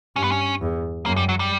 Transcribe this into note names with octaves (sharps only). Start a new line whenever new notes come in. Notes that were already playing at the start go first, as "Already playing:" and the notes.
G2 C#4
B3
C#4
E2
F#2 A#3
G3
F#3
G3